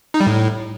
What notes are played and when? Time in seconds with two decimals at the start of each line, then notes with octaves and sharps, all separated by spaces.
0.14 D#4
0.20 G3
0.27 A2